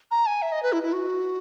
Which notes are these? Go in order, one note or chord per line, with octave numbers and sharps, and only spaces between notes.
A#5
G#5
E5
D#5
B4
E4
E4
F#4